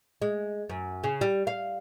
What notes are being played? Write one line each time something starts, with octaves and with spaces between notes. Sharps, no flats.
G#3
F#2
C#3
G3
F5